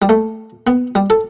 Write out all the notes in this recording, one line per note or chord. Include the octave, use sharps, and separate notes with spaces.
G3
A3
B3
G3
A4